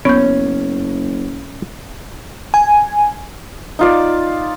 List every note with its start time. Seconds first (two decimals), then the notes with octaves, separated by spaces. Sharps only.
0.05 F#1 B3 C#4 G6
2.54 G#5
3.79 D#4 F4 D5